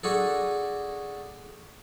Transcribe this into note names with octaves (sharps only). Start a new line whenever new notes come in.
D4 F#4 G#4 A4